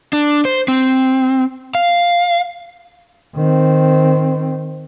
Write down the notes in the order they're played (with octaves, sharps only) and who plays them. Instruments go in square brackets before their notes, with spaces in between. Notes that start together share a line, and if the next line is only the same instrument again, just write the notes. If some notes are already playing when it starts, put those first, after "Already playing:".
[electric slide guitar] D4
C5
C4
F5
[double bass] D#3 C4